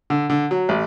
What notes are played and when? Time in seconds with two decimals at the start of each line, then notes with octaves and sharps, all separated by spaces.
0.10 D3
0.30 D3
0.51 F#3
0.69 A1